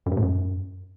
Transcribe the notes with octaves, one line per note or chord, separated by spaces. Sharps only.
F#2
G2
A2
F#2